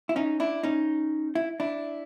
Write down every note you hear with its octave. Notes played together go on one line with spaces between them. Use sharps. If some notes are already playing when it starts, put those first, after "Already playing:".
E4
C#4 D#4
D4 E4
C#4 D#4
E4
D4 E4